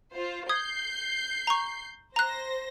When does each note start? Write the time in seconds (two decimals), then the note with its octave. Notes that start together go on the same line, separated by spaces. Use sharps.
0.12 F4 C5
0.49 D#6 G6 G#6 C7
1.47 A#5 C#6
2.16 C5 A#5 F#6 A#6